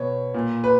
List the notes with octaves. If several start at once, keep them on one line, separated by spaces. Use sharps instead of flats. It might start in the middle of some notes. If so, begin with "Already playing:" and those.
Already playing: B2 C#5
A#2
B4